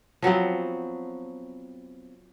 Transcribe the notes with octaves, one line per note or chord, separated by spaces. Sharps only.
F3 F#3 B3 C4